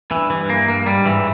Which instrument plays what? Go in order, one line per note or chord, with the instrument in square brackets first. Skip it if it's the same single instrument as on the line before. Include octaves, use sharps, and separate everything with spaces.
[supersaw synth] G2 [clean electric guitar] E3
[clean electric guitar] E3
A#3
A#3
[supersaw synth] G#2 [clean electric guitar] G3
[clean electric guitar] E3